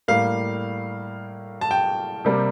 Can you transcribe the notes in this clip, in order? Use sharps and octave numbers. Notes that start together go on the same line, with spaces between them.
A2 G3 A#3 F5
A5
G5
C3 G3 A#3